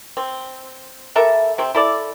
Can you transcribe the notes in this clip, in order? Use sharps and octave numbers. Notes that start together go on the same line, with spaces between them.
C4
G3 A4 A#4 E5
C3 C4
E4 A4 D5